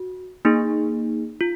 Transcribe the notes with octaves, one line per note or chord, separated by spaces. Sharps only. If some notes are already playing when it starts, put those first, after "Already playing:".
Already playing: F#4
A#3 D#4 G#4
F4